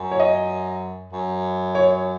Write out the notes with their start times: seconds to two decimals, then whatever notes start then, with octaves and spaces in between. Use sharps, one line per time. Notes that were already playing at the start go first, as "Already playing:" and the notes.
Already playing: F#2
0.12 C#5
0.20 D#5
1.12 F#2
1.75 C#5